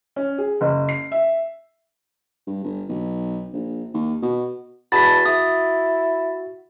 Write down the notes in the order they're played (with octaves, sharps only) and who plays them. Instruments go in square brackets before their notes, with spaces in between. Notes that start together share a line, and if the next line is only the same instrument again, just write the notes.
[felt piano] C#4
G#4
F#1
C7
E5
[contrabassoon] G2
G1
B1
A#1
D#2
B2
[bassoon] E2 [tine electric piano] F#4 [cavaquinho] D#5 A5 B5 [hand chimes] A6 B6
[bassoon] E4 [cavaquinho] D#6